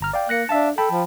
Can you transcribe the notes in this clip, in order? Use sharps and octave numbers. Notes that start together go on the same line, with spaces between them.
G1 A#5 F6
D5 F5 G5
A#3 F#6 A#6 C#7
D4 E5 F5 A5
A4 G5 A5 B5
F3